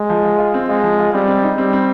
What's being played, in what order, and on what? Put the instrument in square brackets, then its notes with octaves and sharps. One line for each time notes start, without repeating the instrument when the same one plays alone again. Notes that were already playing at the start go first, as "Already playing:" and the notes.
Already playing: [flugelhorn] G#3
[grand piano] F3
F4
F4
C4
[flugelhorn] G#3 [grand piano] F4
[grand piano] F3
F4
[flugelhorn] G3 [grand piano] C4
[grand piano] C4
D#4
[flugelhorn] G3 [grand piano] C4
[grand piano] C4